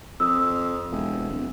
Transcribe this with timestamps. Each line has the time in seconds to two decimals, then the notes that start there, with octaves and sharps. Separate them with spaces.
0.20 F2 D#6 E6
0.92 E1
1.30 D1